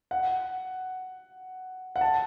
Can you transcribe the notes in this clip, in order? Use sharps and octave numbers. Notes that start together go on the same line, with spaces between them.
F#5
F#5
A5